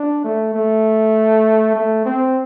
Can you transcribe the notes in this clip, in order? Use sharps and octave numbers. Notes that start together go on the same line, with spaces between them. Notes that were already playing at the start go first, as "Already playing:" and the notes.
Already playing: D4
A3
A3
A3
C4